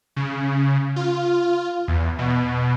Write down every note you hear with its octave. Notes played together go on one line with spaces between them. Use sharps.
C#3
F4
E2
B2